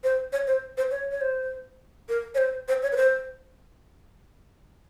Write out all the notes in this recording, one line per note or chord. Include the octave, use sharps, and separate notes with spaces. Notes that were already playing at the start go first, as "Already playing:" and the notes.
C5
C#5
C5
C5
C#5
C#5
C5
A#4
C#5
C5
C5
C#5
B4
C5